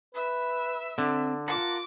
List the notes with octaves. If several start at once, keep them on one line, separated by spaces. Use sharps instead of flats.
B4 E5
D3 C4
F4 A#4 F#5 A5 D6